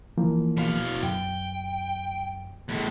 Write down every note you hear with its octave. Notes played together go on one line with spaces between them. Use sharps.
E3 F3 A#3
B2 F5
F#2 G5
E2 A2